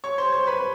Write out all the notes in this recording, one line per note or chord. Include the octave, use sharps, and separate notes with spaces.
C#5 C#6
C5 C6
C5 C6
B4 B5